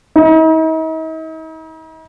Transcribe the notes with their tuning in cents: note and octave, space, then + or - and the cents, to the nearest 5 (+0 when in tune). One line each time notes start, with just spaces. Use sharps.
D#4 +45